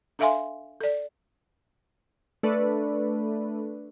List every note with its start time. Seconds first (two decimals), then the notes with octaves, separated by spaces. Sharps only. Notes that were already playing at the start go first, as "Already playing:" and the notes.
0.19 D4 A4 E5 F5 G#5 C6
0.81 A4 D5
2.43 A3 D4 B4